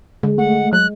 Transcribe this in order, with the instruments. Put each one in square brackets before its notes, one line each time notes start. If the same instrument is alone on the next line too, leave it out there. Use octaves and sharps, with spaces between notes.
[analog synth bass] D3 [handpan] G#3
[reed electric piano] A3 [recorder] F#5
[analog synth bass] F#3 [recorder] F#6